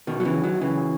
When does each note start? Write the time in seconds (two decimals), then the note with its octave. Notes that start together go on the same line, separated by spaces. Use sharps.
0.07 B2 D#3
0.20 F#3
0.25 C#3 E3
0.43 D#3 F#3
0.61 C#3 E3